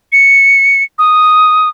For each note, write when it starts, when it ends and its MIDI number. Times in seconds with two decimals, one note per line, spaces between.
0.12 0.83 97
0.99 1.69 87